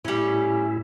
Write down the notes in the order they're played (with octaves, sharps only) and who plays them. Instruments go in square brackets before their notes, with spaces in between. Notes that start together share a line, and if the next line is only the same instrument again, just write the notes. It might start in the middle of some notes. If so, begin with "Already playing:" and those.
[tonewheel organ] A2 E4 [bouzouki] G3 C#4